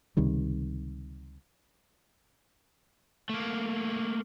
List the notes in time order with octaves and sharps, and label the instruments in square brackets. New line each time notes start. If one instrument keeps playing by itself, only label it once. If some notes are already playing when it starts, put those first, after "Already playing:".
[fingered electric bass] C#2 C3 D#3 G3
[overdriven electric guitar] A3 A#3